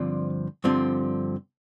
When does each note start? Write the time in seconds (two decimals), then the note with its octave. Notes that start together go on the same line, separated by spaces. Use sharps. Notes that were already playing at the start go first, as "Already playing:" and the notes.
Already playing: G2 D3 F3 C4 D5
0.64 G2 D3 F3 C4